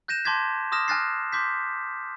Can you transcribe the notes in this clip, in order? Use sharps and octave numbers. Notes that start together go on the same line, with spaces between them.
F#6 G6 A#6 D#7 E7
A5 C6 D6 G6 G#6 B6
C6 D6 D#6 F6 A#6 E7
G#5 F6 F#6 A6 A#6 C7
C6 D6 G6 B6